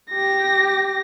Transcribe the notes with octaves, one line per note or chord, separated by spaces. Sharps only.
G4 A#6